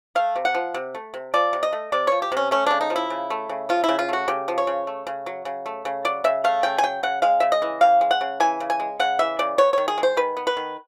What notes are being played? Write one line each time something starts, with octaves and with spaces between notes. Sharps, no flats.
A3 F5
C3
F#5
F3
C3
A3
C3
F3 D5
C3
D#5
A3
C3 D5
F3 C#5
G4
C3 C#4
A3 C#4
C#3 D4
D#4
F3
E4
C#3
A3
C#3
F3 F4
C#3 E4
F4
A3 F#4
C#3 G4
F3
C#5
C#3
A3
C#3
F#3
C#3
A3
C#3
F#3 D5
C#3 E5
A3 F5
C#3 G5
G#5
F#3 G5
C#3 F#5
G#3 F5
C#3 E5
D#5
E3
C#3 F5
G#3
F#5
C#3
E3 G#5
C#3
G#5
G#3
C#3 F#5
E3 E5
C#3 D5
B3 C#5
D#3 C#5
G#4
G#3
C5
D#3 B4
B3
B4
D#3